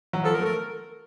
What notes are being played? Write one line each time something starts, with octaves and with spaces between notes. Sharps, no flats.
F#3
F3 A4
A#4
A3
A#4